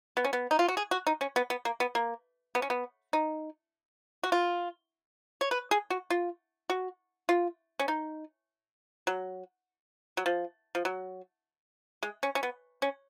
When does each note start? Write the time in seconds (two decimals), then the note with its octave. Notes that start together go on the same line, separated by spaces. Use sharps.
0.17 B3
0.24 C#4
0.33 B3
0.51 D#4
0.59 F4
0.68 F#4
0.77 G#4
0.91 F#4
1.07 D#4
1.21 C#4
1.36 B3
1.50 B3
1.65 A#3
1.80 B3
1.95 A#3
2.55 B3
2.62 C#4
2.70 B3
3.13 D#4
4.23 F#4
4.32 F4
5.41 C#5
5.51 B4
5.71 G#4
5.90 F#4
6.10 F4
6.70 F#4
7.29 F4
7.79 C#4
7.88 D#4
9.07 F#3
10.17 F#3
10.26 F3
10.75 F3
10.85 F#3
12.03 G#3
12.23 C#4
12.35 C#4
12.43 B3
12.82 C#4